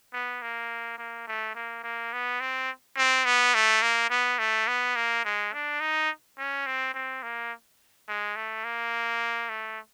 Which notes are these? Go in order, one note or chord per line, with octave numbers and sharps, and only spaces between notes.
B3
A#3
A#3
A3
A#3
A#3
B3
C4
C4
B3
A3
A#3
B3
A3
B3
A#3
G#3
D4
D#4
C#4
C4
C4
A#3
G#3
A3
A#3
A3